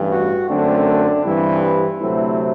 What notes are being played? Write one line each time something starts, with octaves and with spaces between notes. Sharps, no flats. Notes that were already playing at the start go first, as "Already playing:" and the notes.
Already playing: A1 G2 E3
F#4
F#2 D3 A3 C4 D4
G2 E3 G3 C4 E4
E4
D2 C3 F#3 A3 C4 E4